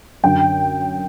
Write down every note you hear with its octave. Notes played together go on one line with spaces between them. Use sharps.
F#2 D3 G5